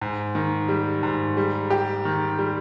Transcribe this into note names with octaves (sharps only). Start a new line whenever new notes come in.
G#2
D#3
G3
G#2
G3
G4
D#3
G3